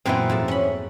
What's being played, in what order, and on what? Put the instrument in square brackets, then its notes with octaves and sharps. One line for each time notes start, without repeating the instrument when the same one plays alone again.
[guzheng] F#2 A#2 B4 [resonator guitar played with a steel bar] E3 B3 C4
[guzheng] F2 G#2 A5
C#4 B5